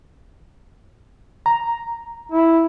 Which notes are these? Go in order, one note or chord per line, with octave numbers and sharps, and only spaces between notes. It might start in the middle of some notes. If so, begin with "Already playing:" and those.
A#5
E4